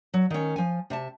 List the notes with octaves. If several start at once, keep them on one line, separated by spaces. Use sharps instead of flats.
F#3
D#3 C#4
F3 G#5
C3 E5 A5